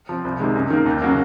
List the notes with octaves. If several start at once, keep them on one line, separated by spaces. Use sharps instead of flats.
F3 C4
C2
C3 D#3 G#3
F#2
D#3 A#3
D#2
C#3 F#3 A#3